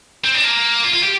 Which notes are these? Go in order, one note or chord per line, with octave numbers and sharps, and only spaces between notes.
C4
D4
A#3
F4
F4
G4